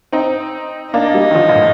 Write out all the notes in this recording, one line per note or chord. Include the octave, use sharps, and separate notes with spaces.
C4 D#4
A#3 D4 D#4
G3 A#3
D#3
D3 F3
A#2
A2